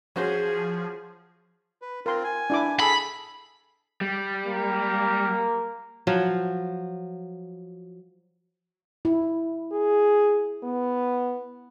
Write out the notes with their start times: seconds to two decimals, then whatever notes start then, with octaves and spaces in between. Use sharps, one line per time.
0.16 F3 C#4 F#4 G#4 C5
1.82 B4
2.06 C4 F4 A#4 C6
2.24 G#5
2.50 D4 E4 D6
2.80 G#4 A4 B5
4.01 G3
4.46 A#3
6.07 F3 F#3
9.05 E4
9.72 G#4
10.63 B3